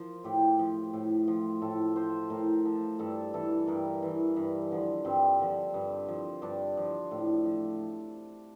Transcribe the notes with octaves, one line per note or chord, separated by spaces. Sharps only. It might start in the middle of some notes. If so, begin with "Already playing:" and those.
Already playing: F3 A#4
A2 G4
F3
A2
F3
A2 A4
F3 C5
A2 A#4
F3 A4
G2 A4
E3 A4
G2 A#4
E3
G2
D3 F3
G2 C4
D3 F3
G2
F3
G2 D4
F3
A2
F3